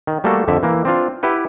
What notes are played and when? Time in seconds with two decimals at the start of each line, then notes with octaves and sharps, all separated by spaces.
0.07 D#3
0.24 G3 A3 A#3 F#4 A4
0.48 F2 D3 E5
0.63 E3 A#3
0.85 C4 D4 F4
1.23 E4 G4 B4 F#5